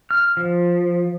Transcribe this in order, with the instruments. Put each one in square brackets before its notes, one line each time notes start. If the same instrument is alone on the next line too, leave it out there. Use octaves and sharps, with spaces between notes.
[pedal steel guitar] F6
F3